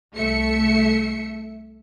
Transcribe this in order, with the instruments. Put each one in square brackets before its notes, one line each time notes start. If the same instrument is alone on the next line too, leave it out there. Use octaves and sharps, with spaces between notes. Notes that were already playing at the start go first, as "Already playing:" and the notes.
[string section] C2 A3 E5 C#7